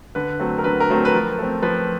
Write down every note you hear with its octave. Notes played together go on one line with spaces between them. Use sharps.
D3 B4
F#3 A3 C4
A#4
D3 B4
A#4
F#3 A3 C4
B4
F3 A#4
A3 C4
F3 B4